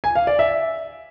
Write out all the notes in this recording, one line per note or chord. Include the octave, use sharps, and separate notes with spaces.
G#5
F5
D5
E5